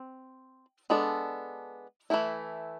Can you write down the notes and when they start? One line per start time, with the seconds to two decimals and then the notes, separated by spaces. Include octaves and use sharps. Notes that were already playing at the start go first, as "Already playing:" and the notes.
Already playing: C4
0.90 G#3 B3 D4 A4
2.10 E3 A3 E4